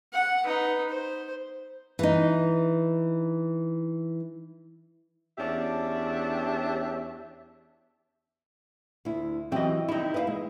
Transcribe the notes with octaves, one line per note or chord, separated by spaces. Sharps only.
F#5
D#4 B4
C5
E3 D#4
E2 C#4 D4 G4 E5
D2 E4
E3 F#3 C4 G4 D#5
D#3 G3 D#4 E4
B4 D#5 F5
G#3